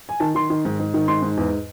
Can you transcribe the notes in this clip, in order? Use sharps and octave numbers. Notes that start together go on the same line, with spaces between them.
G#5
D#3 A5
D#3 C6
D#3
G#2
G#2
D#3
G#2 C6
G#2
E2